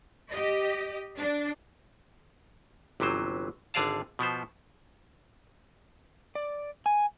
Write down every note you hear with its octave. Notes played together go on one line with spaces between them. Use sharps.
G4 D#5
D4
G1 C3 E3 F#3 C5
G#1 D3 G#4 D5 F5 A5
B2 F3 B3 C5
D5
G#5